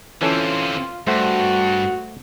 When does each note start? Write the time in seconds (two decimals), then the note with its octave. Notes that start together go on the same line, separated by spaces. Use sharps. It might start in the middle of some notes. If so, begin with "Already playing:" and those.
0.22 D3 E3 C4 C#4 F4 A4
1.07 G2 A3 F#4 C5 F#5